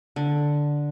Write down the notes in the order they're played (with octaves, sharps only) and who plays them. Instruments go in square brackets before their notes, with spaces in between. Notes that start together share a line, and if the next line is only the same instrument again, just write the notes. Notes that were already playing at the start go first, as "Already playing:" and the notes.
[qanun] D3